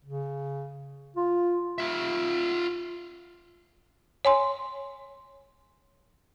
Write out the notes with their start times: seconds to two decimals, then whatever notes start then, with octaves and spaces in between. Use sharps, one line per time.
0.04 C#3
1.17 F4
1.78 F4 E5
4.25 C#5 G#5 C6